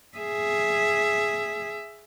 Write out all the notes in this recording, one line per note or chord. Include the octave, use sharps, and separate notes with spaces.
G#4 E5